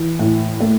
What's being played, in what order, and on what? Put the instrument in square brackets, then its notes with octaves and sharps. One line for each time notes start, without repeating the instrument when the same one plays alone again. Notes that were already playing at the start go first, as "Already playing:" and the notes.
Already playing: [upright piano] E3
A2
A3